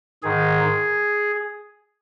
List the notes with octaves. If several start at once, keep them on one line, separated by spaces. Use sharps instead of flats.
G#2 D#3 G#4